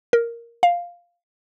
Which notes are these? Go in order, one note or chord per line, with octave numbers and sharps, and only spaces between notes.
A#4
F5